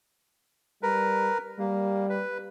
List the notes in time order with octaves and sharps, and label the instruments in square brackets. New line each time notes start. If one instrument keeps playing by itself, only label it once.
[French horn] G3 [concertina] A#4 B4
[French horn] G3 [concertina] A#3
[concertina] B4